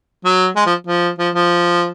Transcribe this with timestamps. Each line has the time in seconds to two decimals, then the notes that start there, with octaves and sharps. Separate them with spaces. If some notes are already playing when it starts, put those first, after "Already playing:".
0.25 F#3
0.56 G#3
0.66 F3
0.87 F3
1.18 F3
1.35 F3